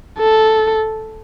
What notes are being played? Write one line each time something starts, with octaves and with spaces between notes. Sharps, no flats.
A4